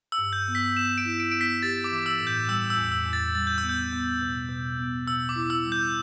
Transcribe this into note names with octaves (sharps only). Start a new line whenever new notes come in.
E6
G2
G6
B3
B6
B3 E7
D7
E4
D7
B3 D7
B6
G4 A6
D6
E3
E6
A2
G6
G3 E6
E6
E2
E6
E2
A6
G3 A6
G6
E6
B3
G6
B3
B2
B2
B3
B2 E6
D6
E4
E6
G3
G6